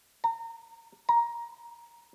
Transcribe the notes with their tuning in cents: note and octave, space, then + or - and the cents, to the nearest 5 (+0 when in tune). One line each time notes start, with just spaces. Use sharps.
A#5 -30
A#5 +15